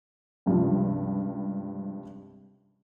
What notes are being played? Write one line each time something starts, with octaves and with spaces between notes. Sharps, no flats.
C#2 G2 C3 F3